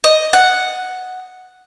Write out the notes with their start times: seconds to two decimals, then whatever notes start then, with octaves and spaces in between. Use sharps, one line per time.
0.04 D#5
0.33 F#5